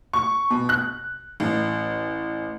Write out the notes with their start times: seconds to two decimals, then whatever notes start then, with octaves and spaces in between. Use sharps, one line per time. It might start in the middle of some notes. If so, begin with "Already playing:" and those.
0.13 C#6
0.50 B2
0.69 F#6
1.40 A1